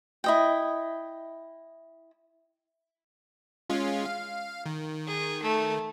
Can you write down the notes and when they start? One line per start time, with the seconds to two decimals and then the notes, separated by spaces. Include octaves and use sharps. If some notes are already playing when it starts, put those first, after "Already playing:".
0.24 E4 D#5 G5
3.70 G#3 C#4 F4
4.05 F5
4.66 D#3
5.07 G#4
5.42 A3